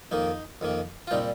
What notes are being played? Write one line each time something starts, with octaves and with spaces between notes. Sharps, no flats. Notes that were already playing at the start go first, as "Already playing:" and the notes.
F2 D#3 A#3 D#4
F2 D#3 A#3
F4
A#2 G3 C4 D#4